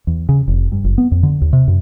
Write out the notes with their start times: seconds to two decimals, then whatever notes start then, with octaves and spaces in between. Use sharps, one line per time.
0.07 E2
0.29 C#3
0.48 F1
0.72 G2
0.85 F#1
0.98 B3
1.12 F2
1.23 D3
1.42 D#2
1.53 C3
1.68 F#2